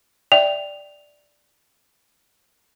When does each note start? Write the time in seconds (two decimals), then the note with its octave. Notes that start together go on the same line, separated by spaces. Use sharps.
0.32 D5 E5 G5 F7